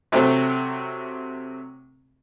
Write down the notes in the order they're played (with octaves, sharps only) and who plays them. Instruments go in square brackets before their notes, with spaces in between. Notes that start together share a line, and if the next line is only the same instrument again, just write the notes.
[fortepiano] C3 F#3 A3 C4